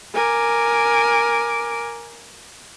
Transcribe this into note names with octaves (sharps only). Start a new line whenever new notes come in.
A#4 G#5 D6